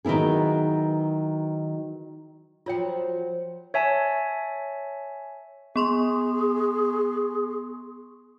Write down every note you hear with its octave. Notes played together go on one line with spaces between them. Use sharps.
D#3 F#3 B3 E4 G#4
F3 F#3 F4 C#5 G5
C#5 E5 G#5 A5
B3 G#4 C6 C#6